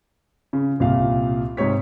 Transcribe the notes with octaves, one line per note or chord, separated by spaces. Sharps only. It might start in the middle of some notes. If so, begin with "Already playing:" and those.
C#3
C2 A#2 F5
G#2 C3 C#5 B6